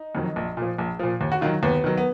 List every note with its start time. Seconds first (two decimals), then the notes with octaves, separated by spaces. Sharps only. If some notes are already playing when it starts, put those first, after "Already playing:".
Already playing: D#4
0.15 F2 D#3 F#3
0.36 A#1
0.57 A#2 F3
0.79 A#1
0.99 A#2 F3
1.21 D#2
1.32 F#4
1.41 D#3 F#3 F4
1.63 D#2 B3
1.84 D#3 F#3
1.97 B3